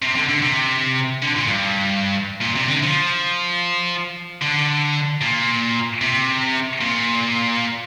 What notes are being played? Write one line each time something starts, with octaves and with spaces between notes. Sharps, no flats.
C3
D3
D3
C3
D3
A#2
G2
A#2
C3
D3
F3
D3
A#2
C3
A#2